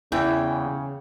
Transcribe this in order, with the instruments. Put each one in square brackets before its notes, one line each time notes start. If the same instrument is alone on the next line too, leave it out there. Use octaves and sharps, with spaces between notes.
[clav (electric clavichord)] E2 E3 [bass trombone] C#3 [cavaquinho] G5